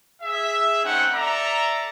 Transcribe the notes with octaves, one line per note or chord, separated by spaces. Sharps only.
G#4 E5
A3 C4 C#4 D#4 F#5
A4 D5 E5 A#5